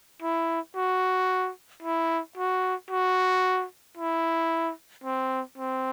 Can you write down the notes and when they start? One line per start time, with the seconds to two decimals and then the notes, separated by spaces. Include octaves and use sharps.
0.22 E4
0.76 F#4
1.83 E4
2.37 F#4
2.91 F#4
3.97 E4
5.04 C4
5.58 C4